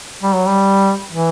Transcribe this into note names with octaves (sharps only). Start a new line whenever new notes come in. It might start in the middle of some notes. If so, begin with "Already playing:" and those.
G3
F#3
G3
E3